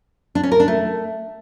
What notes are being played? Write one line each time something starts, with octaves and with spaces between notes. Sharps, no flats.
D4
C#4
A#4
D4
A3